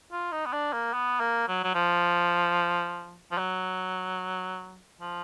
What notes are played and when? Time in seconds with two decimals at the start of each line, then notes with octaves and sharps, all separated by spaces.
0.12 F4
0.32 D#4
0.46 B3
0.53 D4
0.73 A#3
0.94 B3
1.20 A#3
1.48 F#3
1.64 F#3
1.75 F3
3.32 F3
3.38 F#3
5.01 F3